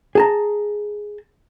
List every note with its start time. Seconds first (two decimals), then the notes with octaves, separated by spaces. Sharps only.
0.15 G#4 A5 A#5